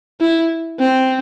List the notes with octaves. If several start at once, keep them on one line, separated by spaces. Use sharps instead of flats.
E4
C4